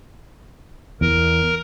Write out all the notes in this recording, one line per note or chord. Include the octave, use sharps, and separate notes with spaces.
E2 A#4